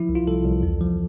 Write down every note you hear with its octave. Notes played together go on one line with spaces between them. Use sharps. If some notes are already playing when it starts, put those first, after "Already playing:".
Already playing: F3 E4
C2
F4
C2 A4
C2
E2
F3